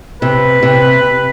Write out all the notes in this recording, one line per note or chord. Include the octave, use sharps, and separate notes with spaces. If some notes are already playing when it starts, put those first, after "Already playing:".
C3 B4
C3